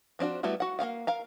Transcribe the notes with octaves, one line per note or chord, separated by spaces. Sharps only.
F3 C4 D4 F#4
G3 A3 B3 E4 F#4
F#4 F#5
A#3 C#4 F5 F#5
A#4 F5 A#5